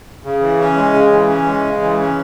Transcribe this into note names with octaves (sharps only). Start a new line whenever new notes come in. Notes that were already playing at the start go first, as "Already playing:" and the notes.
C#3
E3
C#4
G#3
C#3
E3
C#4
G#3
C#3
E3
C#4